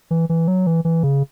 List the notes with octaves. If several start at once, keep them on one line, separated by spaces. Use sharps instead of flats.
E3
E3
F#3
E3
E3
C#3